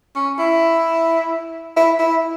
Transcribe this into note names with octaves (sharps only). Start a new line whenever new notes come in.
C#4
E4
E4
E4